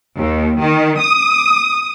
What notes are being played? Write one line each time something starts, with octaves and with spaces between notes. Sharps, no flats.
D#2
D#3
D#6